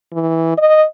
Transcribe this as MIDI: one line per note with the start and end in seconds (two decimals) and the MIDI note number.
0.13 0.57 52
0.57 0.84 75